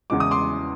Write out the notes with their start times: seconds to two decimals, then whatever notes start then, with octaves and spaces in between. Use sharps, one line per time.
0.10 E2 C#3 E3 G#3 D6
0.20 D#6
0.31 C6 D6